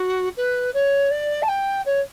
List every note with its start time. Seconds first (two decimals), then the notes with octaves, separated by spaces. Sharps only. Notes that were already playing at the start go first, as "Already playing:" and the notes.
Already playing: F#4
0.37 B4
0.74 C#5
1.10 D5
1.42 A5
1.48 G5
1.86 C#5